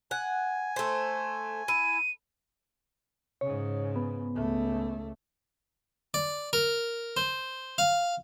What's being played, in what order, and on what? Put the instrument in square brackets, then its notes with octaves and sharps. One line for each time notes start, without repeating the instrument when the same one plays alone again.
[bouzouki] F#5 [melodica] G#5
[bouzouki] A3 C5
[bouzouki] E4 [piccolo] D#7
[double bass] G#2 C#3 [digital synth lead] C#5
[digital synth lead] B3
[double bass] C#2 A3
[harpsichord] D5
A#4
C5
F5